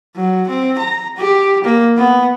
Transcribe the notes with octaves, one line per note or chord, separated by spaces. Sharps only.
F#3
C4
A#5
G4
A#3
B3